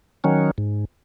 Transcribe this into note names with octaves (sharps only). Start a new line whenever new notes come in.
D#3 F#3 C#4
G#2